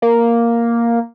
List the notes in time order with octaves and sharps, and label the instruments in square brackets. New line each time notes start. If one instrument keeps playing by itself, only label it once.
[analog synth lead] A#3